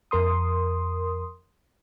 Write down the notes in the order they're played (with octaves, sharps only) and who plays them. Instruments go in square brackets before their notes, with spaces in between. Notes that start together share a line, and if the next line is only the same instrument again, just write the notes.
[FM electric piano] F2 A#4 C6 D#6